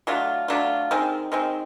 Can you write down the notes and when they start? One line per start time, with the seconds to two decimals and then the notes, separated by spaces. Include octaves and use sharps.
0.07 F#3 A3 D4 F4
0.48 F#3 A3 D4 F4
0.91 D#3 G#3 C4
1.32 D#3 G#3 C4